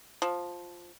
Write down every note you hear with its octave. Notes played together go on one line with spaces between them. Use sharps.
F3